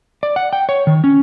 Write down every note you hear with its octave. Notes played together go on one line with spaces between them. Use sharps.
D5
F#5
G5
C#5
D#3
C#4